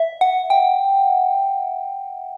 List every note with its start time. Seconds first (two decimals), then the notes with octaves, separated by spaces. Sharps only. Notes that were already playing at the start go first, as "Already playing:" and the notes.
Already playing: E5
0.21 F#5
0.50 G5